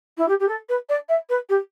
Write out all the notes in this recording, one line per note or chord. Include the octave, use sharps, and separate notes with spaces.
E4
G4
G4
A4
B4
D5
E5
B4
G4